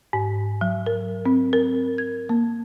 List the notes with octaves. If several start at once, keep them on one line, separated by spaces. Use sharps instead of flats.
G#2
F#3
A#4
C4
A#4
G#6
A#3